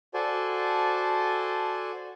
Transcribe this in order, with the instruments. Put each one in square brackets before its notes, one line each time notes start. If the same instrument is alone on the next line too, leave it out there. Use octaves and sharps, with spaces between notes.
[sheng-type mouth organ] F#4 A4 C5 D5 G#5 A5